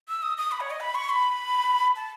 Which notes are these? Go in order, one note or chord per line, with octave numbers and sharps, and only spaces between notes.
E6
D#6
D#6
B5
C#5
D#5
B5
C#6
B5
A5